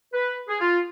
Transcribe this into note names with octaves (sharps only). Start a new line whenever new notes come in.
B4
G#4
F4